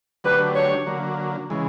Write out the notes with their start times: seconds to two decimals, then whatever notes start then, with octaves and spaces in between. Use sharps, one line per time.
0.24 D3 F#3 A3 D4 G4 B4
0.55 C#5
0.86 D3 F#3 A#3
1.50 C#3 E3 G#3